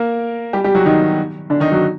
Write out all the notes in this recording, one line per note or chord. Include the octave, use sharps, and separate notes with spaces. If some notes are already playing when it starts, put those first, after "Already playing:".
Already playing: A#3 A#4
G3 G4
G3 G4
F#3 F#4
D#3 D#4
D3 D4
D#3 D#4
F#3 F#4